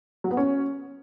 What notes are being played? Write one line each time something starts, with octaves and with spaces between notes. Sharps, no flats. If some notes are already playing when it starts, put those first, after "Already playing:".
F#3
B3
C#4